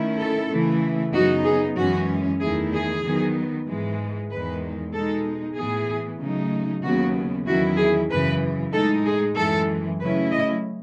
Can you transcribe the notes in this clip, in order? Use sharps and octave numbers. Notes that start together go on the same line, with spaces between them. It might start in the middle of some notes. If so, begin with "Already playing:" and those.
Already playing: D#3 A3 C#4 E4
A4
C#3 E3 A3 E4
F#2 C#3 F#3 B3 D#4 F#4
G#4
F#2 E3 G#3 C#4 F#4
E2 D#3 A3 E4 G#4
G#4
D#3 F#3 B3
G#2 E3 G#3
E2 D#3 G#3 B4
B2 G#3 D#4 A4
A2 E3 B3 G#4
C#3 F#3 A3 D#4
D#2 C#3 F#3 B3 F#4
E2 D#3 F#3 C#4 E4 F#4
G#4
F#2 C#3 E3 B4
A2 G#3 D#4 A4
G#4
F#2 E3 G#3 A4
C#3 F#3 A3 C#4 E4 B4
D#5